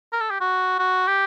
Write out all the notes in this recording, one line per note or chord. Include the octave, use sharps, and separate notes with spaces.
A#4
A4
G4
F#4
F#4
G4